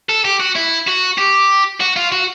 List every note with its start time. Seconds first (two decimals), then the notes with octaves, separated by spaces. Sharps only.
0.09 A4
0.25 G4
0.40 F#4
0.56 E4
0.87 F#4
1.18 G4
1.81 F#4
1.96 F4
2.12 F#4